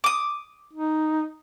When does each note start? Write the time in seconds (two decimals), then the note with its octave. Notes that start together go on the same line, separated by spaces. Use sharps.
0.04 D6 D#6
0.73 D#4